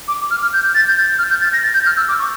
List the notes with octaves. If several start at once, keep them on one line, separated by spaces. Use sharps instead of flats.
D6
F6
F6
G6
A6
G6
A6
F6
G6
A6
A#6
A6
G6
F6
E6
D6
C#6